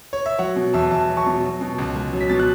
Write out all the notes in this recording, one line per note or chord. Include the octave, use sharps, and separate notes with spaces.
C#5
E5
F#3 C#5 F#5
B2
E2 E5 A5
E2 E5 A5
F#3
A5 C#6
B2
F#3
B2
C#2
C#2
F#3
B6
B2 A6
F#6